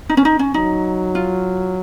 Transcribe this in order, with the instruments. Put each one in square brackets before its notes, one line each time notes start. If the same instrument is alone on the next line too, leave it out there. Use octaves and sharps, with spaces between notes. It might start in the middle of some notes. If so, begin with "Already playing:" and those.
[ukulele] D#4
C#4
D#4
C#4
[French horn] F#3 [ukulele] D#4
[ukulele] F4